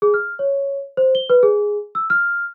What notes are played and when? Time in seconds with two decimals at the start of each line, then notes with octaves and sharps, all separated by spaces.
0.02 G#4
0.14 F6
0.39 C#5
0.97 C5
1.15 G7
1.30 B4
1.43 G#4
1.95 E6
2.10 F6